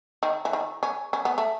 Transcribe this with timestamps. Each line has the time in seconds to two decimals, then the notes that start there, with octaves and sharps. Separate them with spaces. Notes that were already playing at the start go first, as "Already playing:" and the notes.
0.23 D#3
0.45 E3
0.53 D#3
0.83 C#4
1.13 C#4
1.25 B3
1.38 A3